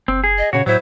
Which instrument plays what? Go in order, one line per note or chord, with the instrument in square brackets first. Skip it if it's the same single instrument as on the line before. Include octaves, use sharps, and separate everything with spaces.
[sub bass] F#1 [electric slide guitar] C4
[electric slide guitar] G#4
[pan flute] D#5
[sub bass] A#2 [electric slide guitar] C#3 F#4 [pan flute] C#5
[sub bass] A2 [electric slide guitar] F#3 E4 [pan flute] C5